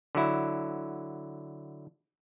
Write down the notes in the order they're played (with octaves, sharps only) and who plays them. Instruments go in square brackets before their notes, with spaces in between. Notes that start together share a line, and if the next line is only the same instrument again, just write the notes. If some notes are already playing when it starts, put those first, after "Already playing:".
[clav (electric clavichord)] D3 F#3 E4